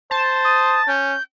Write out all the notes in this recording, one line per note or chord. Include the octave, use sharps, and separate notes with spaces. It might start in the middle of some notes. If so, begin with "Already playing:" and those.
C5 A5
D#6
C#4 G6